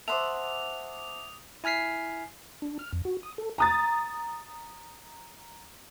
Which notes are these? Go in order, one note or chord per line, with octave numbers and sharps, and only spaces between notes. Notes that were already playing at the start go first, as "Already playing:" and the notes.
C5 E5 F#5 A5 C6 D6 D#6 F7
E4 G#5 F6 B6 C7
D4
F6
F2
F#4
D#6
A4
A#5 D#6 A6